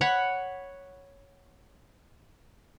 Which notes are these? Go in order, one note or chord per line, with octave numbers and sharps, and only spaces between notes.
C#5 F#5 B5